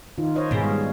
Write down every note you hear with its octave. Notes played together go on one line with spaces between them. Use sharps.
D#3 D#4 F4
C5 C#5 D#5
G#2 B2 B3 G#4
G3 G#3 F5